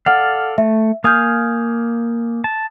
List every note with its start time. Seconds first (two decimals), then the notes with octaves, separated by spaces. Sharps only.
0.06 A4 D5 F5 F#5 F6
0.58 A3 E5
1.04 A#3 F5 G#5 D#6 F6 G6
2.44 A5